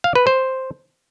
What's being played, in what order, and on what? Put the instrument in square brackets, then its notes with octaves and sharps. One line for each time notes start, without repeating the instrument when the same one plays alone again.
[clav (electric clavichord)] F5
B4
C5